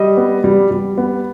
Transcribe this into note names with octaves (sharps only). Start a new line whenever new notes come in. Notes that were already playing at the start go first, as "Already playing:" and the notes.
Already playing: G3 D#5
B3
G3
G3
B3